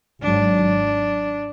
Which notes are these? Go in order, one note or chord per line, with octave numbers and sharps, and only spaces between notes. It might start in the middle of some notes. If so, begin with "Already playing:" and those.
G#1 G#2 F#3 D4